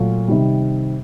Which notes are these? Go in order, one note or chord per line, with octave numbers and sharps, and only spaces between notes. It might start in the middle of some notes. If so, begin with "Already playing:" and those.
Already playing: A#2 F#3 A3 F4
C3 D#3 G3